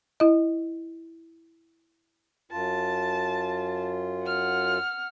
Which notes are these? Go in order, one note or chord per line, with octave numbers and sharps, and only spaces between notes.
E4 D#5
F#2 F4 A5
F#5 F6